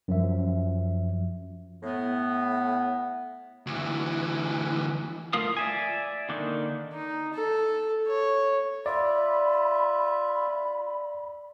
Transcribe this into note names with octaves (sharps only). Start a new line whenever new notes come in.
F#2 F3 E5
A2 B3
D2 E3
A3 F4 A#4 F5 D#6
D5 E5 G#5
D3 D#3 A#3 D4 D#4
D#4
A4
C#5
F4 D5 E5 B5